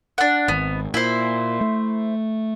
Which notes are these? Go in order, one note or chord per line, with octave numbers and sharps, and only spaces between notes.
D4 F#5
G#1 B3
A#2 E4 C5
A3